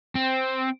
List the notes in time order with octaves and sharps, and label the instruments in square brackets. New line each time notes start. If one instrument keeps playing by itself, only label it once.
[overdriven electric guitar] C4